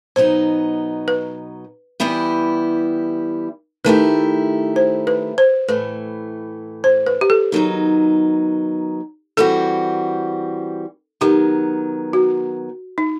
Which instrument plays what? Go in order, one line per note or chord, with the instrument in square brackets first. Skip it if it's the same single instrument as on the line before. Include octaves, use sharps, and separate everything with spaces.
[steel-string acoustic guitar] B2 F#3 B3 D#4 [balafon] C5
[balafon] B4
[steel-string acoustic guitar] E3 G3 B3 E4 G4
[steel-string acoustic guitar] D#3 A3 E4 G4 [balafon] B4
[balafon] C5
B4
C5
[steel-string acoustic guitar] A2 E3 A3 [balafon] B4
[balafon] C5
B4
G4
A4
[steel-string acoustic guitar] D#3 F#3 B3 D#4
[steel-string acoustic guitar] E3 G3 C4 F#4 [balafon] A4
[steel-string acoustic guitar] D#3 F#3 B3 [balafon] G4
[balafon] F#4
D#4